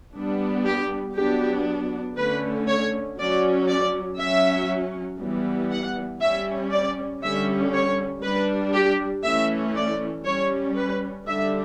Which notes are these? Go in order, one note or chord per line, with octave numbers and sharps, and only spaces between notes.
G3 B3 D4
G4
F#3 B3 D4 G4
D3 A3 C#4 B4
C#5
F#3 C#4 D5
D5
F#3 C#4 E5
E3 G3 B3
F#5
G3 C#4 E5
D5
D3 G3 C#4 E5
C#5
G3 D4 B4
G4
E3 A3 C#4 E5
D5
G3 C#4 C#5
B4
D3 G3 D4 E5